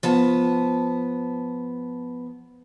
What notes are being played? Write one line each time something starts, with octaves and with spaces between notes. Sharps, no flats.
F3 B3 A5